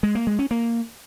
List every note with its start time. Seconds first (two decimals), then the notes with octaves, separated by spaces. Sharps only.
0.03 G#3
0.15 A#3
0.27 G#3
0.39 C#4
0.51 A#3